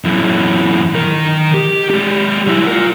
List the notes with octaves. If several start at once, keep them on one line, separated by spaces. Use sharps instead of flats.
F#2 E3
D#3 A#4
G4
G#3 G4
F#3 E4
F4 A#4